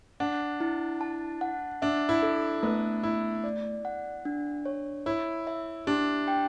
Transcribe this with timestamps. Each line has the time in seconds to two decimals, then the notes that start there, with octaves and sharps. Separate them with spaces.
0.20 D4 F#5
0.60 E4
1.01 A5
1.41 F#5
1.82 D4 E5
2.09 E4
2.22 A4
2.63 A3 B3
3.03 A3 E4
3.44 D5
3.85 F#5
4.25 D4
4.66 C#5
5.06 E4 C#5
5.47 E5
5.87 D4 G4
6.28 G5